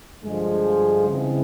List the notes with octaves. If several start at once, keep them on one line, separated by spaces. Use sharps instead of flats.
G2 D3 F3 G#3
C#3 E3 G#3 C4 E4